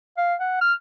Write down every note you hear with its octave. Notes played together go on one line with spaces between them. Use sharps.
F5
F#5
F6